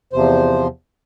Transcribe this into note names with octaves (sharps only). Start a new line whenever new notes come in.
E2 C3 F3 C5